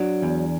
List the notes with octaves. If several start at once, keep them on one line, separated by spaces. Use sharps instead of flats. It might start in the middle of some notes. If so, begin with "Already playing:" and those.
Already playing: F#3 D4
E2